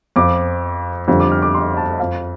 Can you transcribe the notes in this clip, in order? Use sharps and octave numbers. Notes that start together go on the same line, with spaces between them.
F2 F3 D6
F2 D3 G3
D6
F6
D6
C6
A5
F2 F3 F5